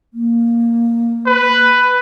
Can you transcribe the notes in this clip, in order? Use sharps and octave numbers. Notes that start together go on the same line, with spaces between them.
A#3
B4